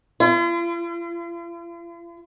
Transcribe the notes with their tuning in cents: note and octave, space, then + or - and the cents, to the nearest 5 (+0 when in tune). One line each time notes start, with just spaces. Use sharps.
F4 -45